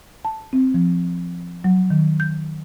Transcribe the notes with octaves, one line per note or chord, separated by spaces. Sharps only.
A5
C4
F3
F#3
D#3
G6